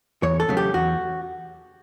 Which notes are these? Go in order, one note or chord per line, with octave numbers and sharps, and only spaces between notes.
E2 C#5
A4
C#3 F#3 A3
G4
E2 F#4